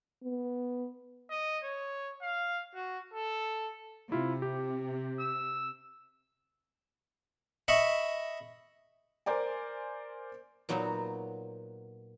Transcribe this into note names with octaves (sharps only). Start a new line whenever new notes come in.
B3
D#5
C#5
F5
F#4
A4
C3 E4 F4
G4
E6
D#5 E5 B5 C#6
A#4 C5 D5 G#5
A#2 F#3 B3 D#4 F#4